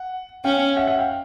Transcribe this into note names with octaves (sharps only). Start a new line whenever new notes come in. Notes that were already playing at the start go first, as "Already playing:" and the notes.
Already playing: F#5
C#4 F5 G5
E5 F#5
E5 F#5
F5 G5